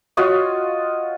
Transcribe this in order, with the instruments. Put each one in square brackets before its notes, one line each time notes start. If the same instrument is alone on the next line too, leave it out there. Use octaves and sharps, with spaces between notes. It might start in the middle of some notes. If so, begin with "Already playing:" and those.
[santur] F4 F#4 C#5 D#5